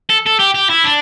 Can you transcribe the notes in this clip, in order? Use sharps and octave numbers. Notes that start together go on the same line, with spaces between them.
A4
A4
G4
G4
E4
D4